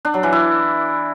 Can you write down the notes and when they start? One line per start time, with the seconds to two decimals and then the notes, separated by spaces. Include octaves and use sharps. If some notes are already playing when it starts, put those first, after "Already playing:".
0.05 D4
0.14 F#3
0.23 E3
0.32 E4